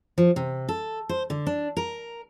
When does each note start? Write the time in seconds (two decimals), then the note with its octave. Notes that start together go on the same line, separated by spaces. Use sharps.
0.18 F3
0.36 C3
0.69 A4
1.09 C5
1.30 D3
1.47 D4
1.77 A#4